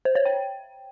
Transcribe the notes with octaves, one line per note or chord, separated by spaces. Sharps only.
C5
C#5
G5